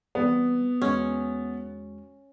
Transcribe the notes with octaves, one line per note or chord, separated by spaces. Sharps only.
E3 G3 B3 C4
E2 G#3 C#4 F#4